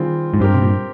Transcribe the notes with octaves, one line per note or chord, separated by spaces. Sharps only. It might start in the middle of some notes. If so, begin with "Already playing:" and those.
Already playing: D#3 G3 C4 F4 G#4
G#2
G2 C4 G4 A#4
C3
A#2